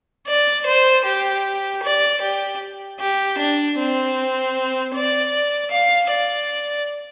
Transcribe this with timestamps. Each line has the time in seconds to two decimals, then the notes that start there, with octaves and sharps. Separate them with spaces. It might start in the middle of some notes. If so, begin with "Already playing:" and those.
0.27 D5
0.67 C5
1.05 G4
1.83 D5
2.22 G4
3.00 G4
3.39 D4
3.78 C4
4.94 D5
5.71 F5
6.10 D5